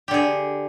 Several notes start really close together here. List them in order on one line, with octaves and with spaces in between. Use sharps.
G4 D3 G#4